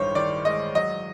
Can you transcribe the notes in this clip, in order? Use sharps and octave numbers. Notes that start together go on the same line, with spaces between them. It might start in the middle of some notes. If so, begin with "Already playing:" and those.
Already playing: A1 G2 D#3 G#3 C5 C#5
D#3 D5
G#3 D#5
F#3 D#5